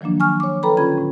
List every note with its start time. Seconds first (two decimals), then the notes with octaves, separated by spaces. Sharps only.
0.01 D#3 F3 F#3 A#3 D4
0.20 G#5 C#6 F6
0.40 C#5 D6
0.63 A4 B4 C#5 G5 A#5 B5
0.77 D3 C#4 F4 B5 G#6
0.98 A2